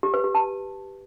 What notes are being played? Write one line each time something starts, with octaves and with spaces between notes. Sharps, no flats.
G4
B4
G4
A5